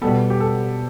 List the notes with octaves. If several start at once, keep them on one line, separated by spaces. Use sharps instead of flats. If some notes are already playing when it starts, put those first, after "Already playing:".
B2 G3 B3 A4
G4
A4